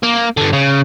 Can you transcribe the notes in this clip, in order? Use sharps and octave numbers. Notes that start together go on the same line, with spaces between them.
A#3
G2 D3
C#3